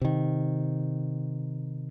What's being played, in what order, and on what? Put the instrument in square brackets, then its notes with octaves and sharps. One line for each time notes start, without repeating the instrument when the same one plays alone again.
[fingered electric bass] C3 D#3